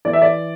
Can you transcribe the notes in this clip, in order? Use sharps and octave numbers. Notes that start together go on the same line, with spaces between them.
E3 D5
E5
D5